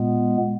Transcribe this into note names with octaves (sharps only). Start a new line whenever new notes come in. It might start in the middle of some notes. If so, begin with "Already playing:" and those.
Already playing: A#2 G#3 B3